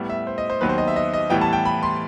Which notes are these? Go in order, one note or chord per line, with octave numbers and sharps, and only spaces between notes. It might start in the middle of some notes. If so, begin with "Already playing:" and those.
Already playing: A2 G3 B3
E5
C5
D#5
C5
D#2 D#3 F#3 B3 B4
C5
D#5
E5
D#5
D#5
A2 E3 G3 B3 G5
A5
G5
B5
C6